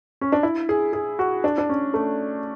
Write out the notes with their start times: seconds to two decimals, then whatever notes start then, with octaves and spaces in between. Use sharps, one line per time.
0.21 C#4
0.32 D4
0.43 E4
0.69 G#4
0.93 G#4
1.19 F#4
1.44 D4
1.58 D4
1.69 C#4
1.94 A3